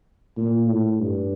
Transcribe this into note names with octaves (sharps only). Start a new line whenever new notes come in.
A#2
A2
G2